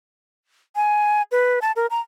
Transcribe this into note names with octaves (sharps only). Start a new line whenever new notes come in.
G#5
B4
A5
A#4
A#5